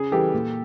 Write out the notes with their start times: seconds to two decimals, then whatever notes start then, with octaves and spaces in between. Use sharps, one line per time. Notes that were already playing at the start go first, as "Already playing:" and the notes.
Already playing: C#3 G#4
0.12 E3 G3 G4 A4
0.34 A#2